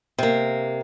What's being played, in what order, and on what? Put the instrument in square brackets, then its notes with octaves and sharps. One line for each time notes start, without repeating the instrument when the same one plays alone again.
[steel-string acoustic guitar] C3 A#3